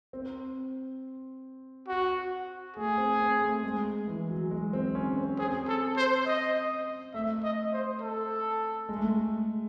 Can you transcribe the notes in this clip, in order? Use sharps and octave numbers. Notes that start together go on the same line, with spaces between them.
C4
F#4
A3 G#4
C4
C4
A3
G#3
E3
F#3
G#3
C4
C#4
C4
C4 G#4
A4
C5
D#5
A3 E5
D#5
C5
A4
G#3
A3
G#3